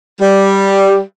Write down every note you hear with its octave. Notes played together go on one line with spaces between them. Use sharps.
G3